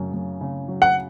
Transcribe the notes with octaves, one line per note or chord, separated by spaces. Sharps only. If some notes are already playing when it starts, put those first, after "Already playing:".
Already playing: F#2 C#3
F#2
C#3
F#3
F#5